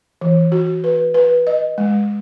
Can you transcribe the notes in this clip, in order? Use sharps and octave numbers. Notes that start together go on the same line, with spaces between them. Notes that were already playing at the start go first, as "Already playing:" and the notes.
E3
F#4
B4
B4
D#5
G#3